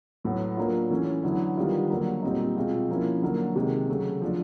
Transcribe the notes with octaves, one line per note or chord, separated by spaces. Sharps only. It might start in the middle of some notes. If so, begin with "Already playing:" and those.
A2 F#3 B3
F#3 A#3 D4 F4
E3 A3 C#4
D3 F#3 B3 E4
D#3 G3 B3 D4 F4
D3 F#3 A#3
A#2 G3 C4 D#4
B2 G#3 C4 F4
F3 A#3 C#4 E4
D3 F#3 A#3
C3 D#3 G#3
C#3 F#3 A3
F3 A3 D4